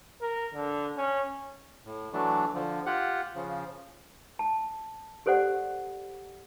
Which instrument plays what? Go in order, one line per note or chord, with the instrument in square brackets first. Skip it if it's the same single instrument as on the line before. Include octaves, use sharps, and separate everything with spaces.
[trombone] A#4
D3
C#4
[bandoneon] A2
E3 F#3 A3 D4
D3 F3
F4 G4 F#5
C#3 F3
[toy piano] A5
G4 A4 C5 D5 F#5